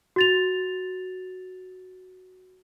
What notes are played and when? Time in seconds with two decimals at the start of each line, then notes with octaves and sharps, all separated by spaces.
0.16 F#4 A6 F7